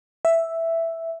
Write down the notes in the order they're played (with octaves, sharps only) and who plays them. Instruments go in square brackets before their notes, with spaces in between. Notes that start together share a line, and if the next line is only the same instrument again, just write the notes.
[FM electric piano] E5